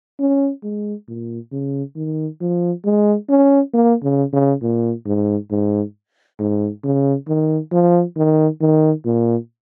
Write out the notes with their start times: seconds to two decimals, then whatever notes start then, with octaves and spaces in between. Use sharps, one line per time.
0.20 C#4
0.63 G#3
1.08 A#2
1.52 C#3
1.96 D#3
2.41 F3
2.85 G#3
3.30 C#4
3.74 A#3
4.03 C#3
4.33 C#3
4.62 A#2
5.06 G#2
5.51 G#2
6.39 G#2
6.84 C#3
7.28 D#3
7.72 F3
8.17 D#3
8.61 D#3
9.05 A#2